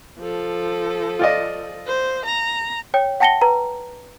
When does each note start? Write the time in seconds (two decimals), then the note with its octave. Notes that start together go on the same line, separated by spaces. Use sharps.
0.19 F3 A4
1.19 F4 D5 D#5
1.87 C5
2.26 A#5
2.94 C#5 G5
3.20 F#5 G5 A5 A#6 C#7 G7
3.41 B4 A#5